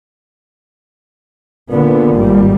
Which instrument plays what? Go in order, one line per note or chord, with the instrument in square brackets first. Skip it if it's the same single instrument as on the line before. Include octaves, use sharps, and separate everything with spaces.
[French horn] A#2 [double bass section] D3 B3
[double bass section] G#1 G3